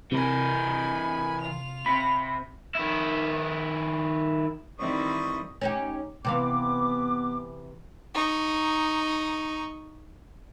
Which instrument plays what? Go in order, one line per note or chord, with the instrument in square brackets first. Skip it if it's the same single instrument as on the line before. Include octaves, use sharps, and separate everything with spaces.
[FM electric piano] C3 [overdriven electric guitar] E3 A#4 [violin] G#5 B5
[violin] F4 F7
[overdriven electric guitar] C3 [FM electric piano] B5
[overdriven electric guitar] D#3 E4
[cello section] D#3 E4 [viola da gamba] E3 G3 C4 [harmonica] D#5 C#6 D#6
[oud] C#4 D#4 G4
[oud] C3 E3 F5 [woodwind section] B3 D6
[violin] D#4 C#6